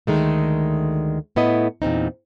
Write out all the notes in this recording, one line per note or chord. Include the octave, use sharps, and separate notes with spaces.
D2 D#3 G#3 A3
A2 B3 E4 D#5
E2 A#2 C4 D#4